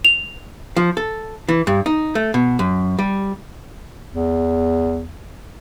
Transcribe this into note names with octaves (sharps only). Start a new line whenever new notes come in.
F7
F3
A4
E3
G2
D#4
A3
B2
F#2
G3
E2